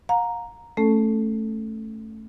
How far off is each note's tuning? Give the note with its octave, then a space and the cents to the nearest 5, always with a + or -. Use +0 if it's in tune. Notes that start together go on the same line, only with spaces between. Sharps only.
F5 +45 A#5 +0
A3 +0 C#4 +0 A4 +0